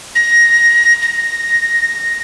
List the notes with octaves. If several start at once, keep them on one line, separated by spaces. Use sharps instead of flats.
A#6
A#6